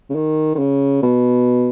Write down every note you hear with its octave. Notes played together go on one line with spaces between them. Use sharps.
C#3
D#3
D#3
C#3
B2